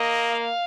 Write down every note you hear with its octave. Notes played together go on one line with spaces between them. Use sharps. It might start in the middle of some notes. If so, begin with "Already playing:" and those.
Already playing: A#3 D#5
F5